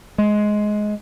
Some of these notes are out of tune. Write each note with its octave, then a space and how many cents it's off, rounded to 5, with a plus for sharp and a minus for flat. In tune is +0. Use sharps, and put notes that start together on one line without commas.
G#3 +15